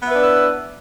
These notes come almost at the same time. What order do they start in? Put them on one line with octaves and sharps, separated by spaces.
B3 E5 B4 D4 E4